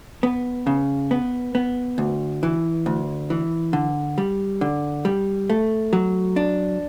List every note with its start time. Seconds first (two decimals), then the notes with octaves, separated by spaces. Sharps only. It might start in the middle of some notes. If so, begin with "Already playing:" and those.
0.23 B3
0.67 C#3
1.11 B3
1.55 B3
1.98 D2
2.43 E3
2.86 D2
3.30 E3
3.73 D3
4.18 G3
4.61 D3
5.05 G3
5.50 A3
5.93 F#3
6.36 D4